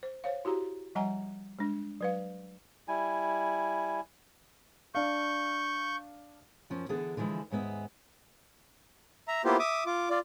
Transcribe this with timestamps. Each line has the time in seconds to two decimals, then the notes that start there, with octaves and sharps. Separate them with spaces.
0.03 C5
0.24 C5 C#5 F5
0.45 E4 F#4 G4 A#5
0.95 F3 G3 D#5 F#5 G#5 A#5
1.59 G#3 D4
2.01 F#3 B4 F5
2.88 G3 E4 G#5
4.95 D4 F5 C#6 G6
6.70 F#2 F3 C#4
6.89 D3 E3 B3 D4 G#4 A4
7.17 D3 E3 F3 G#3 E4
7.50 D#2 G#2 G#3 B3 E5
9.28 E5 A#5
9.45 A#3 B3 E4 F4 G4 C5
9.59 E5 D6 D#6
9.86 F4 D6
10.10 F4 D5